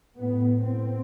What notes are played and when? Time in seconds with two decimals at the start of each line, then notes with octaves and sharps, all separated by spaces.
0.17 A2 B3
0.64 A2 C4